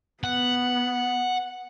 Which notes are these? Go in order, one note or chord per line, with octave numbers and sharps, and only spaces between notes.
B3 F#5